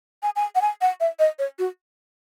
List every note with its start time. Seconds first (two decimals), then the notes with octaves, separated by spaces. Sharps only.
0.23 G#5
0.36 G#5
0.55 F#5
0.62 G#5
0.81 F#5
1.00 E5
1.19 D#5
1.39 C#5
1.59 F#4